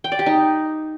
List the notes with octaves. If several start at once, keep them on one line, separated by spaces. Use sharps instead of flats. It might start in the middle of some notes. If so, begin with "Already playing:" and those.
G5
D5
G4
D#4